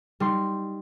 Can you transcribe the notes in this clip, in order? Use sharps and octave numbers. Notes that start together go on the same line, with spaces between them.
G3 D#4 C6